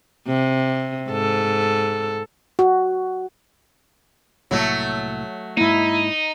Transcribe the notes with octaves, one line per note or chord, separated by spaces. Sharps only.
C3
G#2 A4
F#4
C2 A2 F#3 A3 A#3
G#2 A#3 D#4 E4